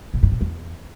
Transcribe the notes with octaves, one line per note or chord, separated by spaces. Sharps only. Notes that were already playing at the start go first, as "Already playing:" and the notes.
A#2
G#2
A#2
E2